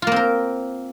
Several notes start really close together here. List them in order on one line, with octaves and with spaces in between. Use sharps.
F4 A#3 C4 A#4